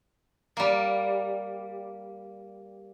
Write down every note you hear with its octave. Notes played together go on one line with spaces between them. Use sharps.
G3 A#3